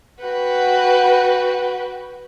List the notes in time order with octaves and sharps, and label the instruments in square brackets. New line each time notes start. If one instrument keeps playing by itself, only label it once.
[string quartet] F#4 B4 F#5 G5